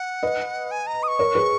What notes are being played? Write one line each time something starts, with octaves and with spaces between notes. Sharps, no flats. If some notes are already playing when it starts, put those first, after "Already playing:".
Already playing: F#5
B4 D#5
G#5
A#5
D#6
C#6
A#4 C#5
G#4 B4